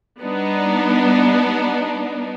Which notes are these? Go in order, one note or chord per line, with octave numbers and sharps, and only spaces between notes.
G3 B3 D4 D#4